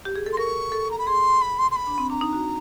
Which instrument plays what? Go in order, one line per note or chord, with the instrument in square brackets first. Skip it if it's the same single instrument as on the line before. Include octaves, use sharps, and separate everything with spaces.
[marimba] G4
G#4
A4
[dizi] C6
[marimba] A#4 [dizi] C#6
[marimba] A4
[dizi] A#5
B5
[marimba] G#4 [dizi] C6
[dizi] B5
C6
C6
B5
[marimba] D4
C4
[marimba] D4 [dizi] A#5
[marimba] D#4
F#4